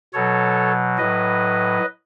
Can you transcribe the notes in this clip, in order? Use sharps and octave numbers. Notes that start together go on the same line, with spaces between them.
B2 F#3 A4 C#5
A2 F#3 B4 D#5